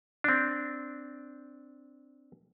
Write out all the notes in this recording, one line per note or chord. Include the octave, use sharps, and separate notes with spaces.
C4 D4